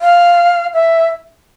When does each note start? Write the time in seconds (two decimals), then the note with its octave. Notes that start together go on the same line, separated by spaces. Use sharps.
0.01 F5
0.74 E5